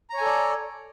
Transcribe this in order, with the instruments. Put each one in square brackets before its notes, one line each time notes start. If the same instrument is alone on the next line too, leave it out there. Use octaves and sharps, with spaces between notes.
[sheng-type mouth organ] A#5
C#5
G#5
A4
D5